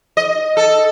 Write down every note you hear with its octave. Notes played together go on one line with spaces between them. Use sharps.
D#5
A4